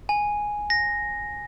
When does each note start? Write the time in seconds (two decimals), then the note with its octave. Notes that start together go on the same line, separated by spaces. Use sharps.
0.09 G#5
0.70 A#6